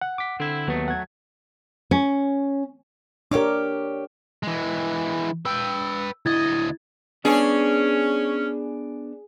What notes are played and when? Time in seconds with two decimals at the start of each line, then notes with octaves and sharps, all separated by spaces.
0.01 F#5
0.18 D6 B6
0.40 D3 C4 E4
0.68 D#2 F#3 A3 B3
0.88 F#5 G#6
1.91 C#4
3.31 D4 G4 A#4 C#5 D6
4.43 E3 G#3
5.45 B4 G5 E6
6.26 D2 E4 D#5 G#6 A6
7.25 B3 C#4 D4 G#4